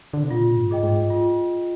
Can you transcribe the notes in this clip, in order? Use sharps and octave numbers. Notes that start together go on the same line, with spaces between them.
D3
C3
A#2 F4
G#2
G#4 D#5 G5
G#2
F4